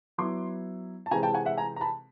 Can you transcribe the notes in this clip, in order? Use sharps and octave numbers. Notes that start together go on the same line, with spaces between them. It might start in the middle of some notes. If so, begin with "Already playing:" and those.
F#3 B3 E4 C6 D6
A5
C3 E3 G#3 C4 G#5 A#5
G5 A5
F#5 G#5
E5 F#5
G#5 A#5
A#5
A5 B5